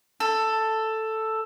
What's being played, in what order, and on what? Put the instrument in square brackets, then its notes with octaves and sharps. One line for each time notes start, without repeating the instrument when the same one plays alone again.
[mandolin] A4